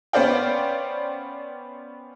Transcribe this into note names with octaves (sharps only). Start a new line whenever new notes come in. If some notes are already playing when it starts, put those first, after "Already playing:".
B3 C#4 C5 D5 F5 G5